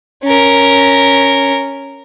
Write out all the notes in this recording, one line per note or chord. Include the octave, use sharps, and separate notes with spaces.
C#4 A#4